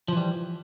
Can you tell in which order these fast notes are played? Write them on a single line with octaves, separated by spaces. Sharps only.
F3 E3 G3